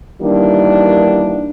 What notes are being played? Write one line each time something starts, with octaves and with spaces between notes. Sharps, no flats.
D#3 E3 G3 A#3 D4